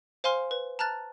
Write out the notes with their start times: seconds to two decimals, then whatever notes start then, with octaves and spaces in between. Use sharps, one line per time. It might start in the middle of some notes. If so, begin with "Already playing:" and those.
0.24 C5 F5 G#5 C6 F6
0.51 B4
0.79 A5 A#5 F6 F#6 A6